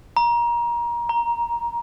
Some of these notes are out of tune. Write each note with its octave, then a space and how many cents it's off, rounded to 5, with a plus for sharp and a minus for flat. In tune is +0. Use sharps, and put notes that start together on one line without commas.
A#5 +25
A#5 +10